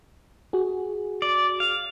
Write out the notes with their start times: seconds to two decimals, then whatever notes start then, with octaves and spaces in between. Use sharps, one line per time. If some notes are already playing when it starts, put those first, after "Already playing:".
0.53 F#4 G#4
1.22 D5
1.60 F5